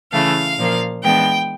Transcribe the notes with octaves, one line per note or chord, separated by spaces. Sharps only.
C#3 E3 A3 F5
A#2 F3 A#3
E3 G#3 B3 D4 G5